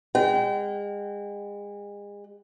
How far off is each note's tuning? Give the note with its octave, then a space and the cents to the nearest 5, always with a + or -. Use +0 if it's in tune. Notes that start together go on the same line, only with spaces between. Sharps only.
G#3 -35 G5 -40